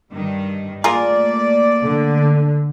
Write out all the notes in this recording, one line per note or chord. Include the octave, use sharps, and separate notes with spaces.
G2 D#3
A3 A#3 F4 G#4 A#4 D5
D3